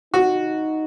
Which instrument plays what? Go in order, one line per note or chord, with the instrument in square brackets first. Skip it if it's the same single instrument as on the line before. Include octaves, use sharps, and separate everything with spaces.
[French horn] D#4 [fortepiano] F#4